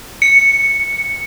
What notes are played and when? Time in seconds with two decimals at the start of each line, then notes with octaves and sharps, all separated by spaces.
0.22 C#7